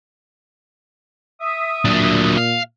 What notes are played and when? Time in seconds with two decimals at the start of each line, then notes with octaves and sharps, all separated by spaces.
1.41 E5 D#6
1.85 A#2 F#3 D4
2.38 F5